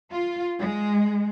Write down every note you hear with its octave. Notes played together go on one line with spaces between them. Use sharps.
F4
G#3